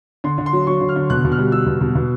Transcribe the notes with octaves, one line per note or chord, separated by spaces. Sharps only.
D3 C6
D3
C6
F#3
F#3 C#6
D3
F6
D3
B2 F#6
B2
F6
G3
G3 E6
B2
B2
B2